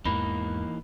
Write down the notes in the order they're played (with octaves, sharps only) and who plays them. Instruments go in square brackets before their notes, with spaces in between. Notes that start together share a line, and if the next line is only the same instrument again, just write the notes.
[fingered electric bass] E2 G#2 [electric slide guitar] E3 A#3 D#4 [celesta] B5